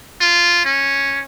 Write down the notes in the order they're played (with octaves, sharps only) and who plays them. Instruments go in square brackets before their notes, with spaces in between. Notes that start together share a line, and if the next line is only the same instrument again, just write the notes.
[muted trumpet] F4
C#4